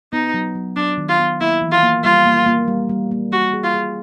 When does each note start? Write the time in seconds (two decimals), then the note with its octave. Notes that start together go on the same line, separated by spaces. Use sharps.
0.13 B3 D#4
0.34 F#3
0.55 F#3
0.76 F#3 D4
0.98 D#3
1.09 F4
1.19 B3
1.41 A#3 E4
1.62 E3
1.72 F4
1.83 A#3
2.04 G3 F4
2.26 A#3
2.46 A#3
2.68 G3
2.89 G3
3.11 A#3
3.32 A#3 F#4
3.54 G#4
3.64 F4
3.74 G#4